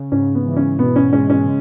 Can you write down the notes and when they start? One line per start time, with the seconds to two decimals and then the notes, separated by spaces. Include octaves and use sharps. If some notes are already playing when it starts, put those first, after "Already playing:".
Already playing: C#3
0.12 G#2 C#4
0.35 B3
0.46 E3
0.56 C#4
0.79 B2 B3
0.96 C#4
1.12 G#3 C#4
1.30 C#4
1.46 C#3